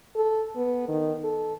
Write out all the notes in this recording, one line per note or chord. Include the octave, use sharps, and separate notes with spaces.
A4
B3
D#3
A4